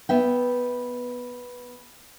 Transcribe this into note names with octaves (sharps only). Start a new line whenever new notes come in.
B3 E5 G5